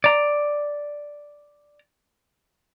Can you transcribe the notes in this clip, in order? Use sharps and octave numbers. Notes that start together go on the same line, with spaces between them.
D5 A#5